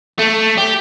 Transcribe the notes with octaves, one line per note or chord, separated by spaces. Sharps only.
A3
G4